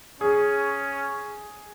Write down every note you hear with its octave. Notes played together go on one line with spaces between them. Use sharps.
C#4 G#4